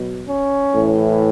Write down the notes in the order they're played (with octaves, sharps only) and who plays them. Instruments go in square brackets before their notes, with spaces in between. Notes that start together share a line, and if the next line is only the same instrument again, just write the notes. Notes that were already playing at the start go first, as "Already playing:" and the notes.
Already playing: [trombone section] B2 F#3
C#4
A2 E3